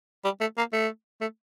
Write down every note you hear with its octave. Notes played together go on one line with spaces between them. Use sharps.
G3
A3
A#3
A3
A3